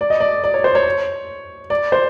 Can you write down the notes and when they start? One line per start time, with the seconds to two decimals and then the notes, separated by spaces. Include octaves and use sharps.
0.01 D5
0.10 D#5
0.20 D5
0.44 D5
0.54 C#5
0.64 C5
0.75 C#5
1.70 D5
1.92 C5